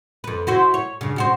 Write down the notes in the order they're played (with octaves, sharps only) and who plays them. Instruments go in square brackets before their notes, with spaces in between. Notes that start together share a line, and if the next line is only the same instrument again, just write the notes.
[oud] F2 B4
E4 F#4 C5
C#5
G2 C#3
B2 F#4 C5